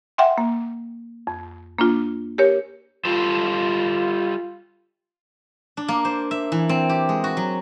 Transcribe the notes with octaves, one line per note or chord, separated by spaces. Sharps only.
E5 F#5 G5 C6
A#3
F2
A#3 D4 F4
G4 A#4 C#5
G3 F4 A4 C5
D4
A#3
C5
E5
E3
C4
G4
G#3
F#4
F#3